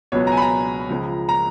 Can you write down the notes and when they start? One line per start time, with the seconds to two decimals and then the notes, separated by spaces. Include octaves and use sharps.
0.12 C#2 B2 F#3 B3 C#5
0.27 A#5
0.32 G#5
0.37 B5
0.42 A#5
0.89 C#2 C#3 F3
1.29 A#5